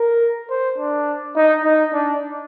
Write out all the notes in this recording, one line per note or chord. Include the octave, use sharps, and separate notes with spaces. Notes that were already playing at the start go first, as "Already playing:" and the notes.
Already playing: A#4
C5
D4
D#4
D#4
D4